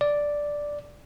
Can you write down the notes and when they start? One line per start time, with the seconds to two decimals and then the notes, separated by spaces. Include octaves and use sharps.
0.01 D5